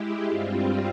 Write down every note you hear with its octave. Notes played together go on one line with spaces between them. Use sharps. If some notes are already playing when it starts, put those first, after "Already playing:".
Already playing: G#3 E4 G4
G2 G3 C4 F4